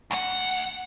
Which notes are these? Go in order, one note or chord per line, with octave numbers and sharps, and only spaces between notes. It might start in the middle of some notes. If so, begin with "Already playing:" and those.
D2 F#5